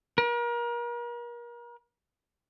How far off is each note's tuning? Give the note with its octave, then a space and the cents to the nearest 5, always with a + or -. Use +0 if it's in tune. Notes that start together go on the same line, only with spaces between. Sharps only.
A#4 +35